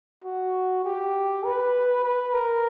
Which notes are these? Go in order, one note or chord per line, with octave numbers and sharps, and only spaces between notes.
F#4
G4
B4
B4
A#4